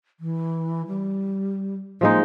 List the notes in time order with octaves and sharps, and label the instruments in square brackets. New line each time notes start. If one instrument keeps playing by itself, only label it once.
[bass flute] E3
G3
[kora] F3 G#3 D#4 [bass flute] A#3